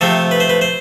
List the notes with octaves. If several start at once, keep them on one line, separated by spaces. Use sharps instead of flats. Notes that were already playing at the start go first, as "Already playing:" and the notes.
C3 F3 A3 C4 A4
B4
C5
B4
C5